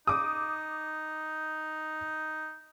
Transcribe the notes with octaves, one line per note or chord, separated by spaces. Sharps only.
D#4 D6 D#6